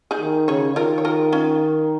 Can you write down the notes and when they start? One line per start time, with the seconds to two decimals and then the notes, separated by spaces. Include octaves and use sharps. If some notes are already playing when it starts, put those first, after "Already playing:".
0.11 D#4 G#4
0.20 D#3
0.48 C#3 G#4 C#5
0.76 D#3 F4 A#4
0.98 C#5
1.05 F4 A#4
1.32 C#4 F4